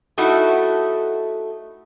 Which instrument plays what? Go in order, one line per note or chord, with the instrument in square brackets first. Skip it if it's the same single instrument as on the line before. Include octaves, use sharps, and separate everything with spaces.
[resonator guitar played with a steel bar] A3 D#4 E4 F#4 A4